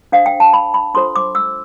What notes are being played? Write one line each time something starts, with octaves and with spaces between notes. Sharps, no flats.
D4 A4 C5 F5
G5
A5
B5
B5
D4 F4 A4 C5 C6
D6
E6